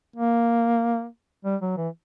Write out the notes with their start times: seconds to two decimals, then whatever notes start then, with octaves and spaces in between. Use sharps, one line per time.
0.16 A#3
1.45 G3
1.62 F#3
1.77 E3